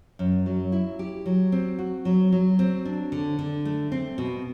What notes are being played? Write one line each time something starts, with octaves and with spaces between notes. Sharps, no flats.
F#2
F#3
E4
G4
F#3
C4
F#4
F#3
F#3
C4
D4
D3
D3
A3
C4
B2